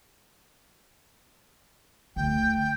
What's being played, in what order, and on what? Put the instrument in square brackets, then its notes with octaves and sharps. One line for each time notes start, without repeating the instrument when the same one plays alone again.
[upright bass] D2 [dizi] G5
[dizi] G5